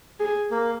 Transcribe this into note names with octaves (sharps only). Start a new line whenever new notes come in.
G#4
A#3